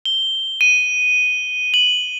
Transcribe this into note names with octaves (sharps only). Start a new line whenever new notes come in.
G7
D#7
F#7